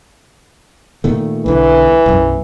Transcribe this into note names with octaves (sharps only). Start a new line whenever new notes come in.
A#2 D#3 A3
B1 D3 E3
B1 F#2